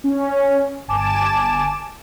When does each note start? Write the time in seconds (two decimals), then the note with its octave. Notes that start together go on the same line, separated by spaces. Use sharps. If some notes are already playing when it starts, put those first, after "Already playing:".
0.04 C#4
0.88 G1 G#5 A5 D6 E7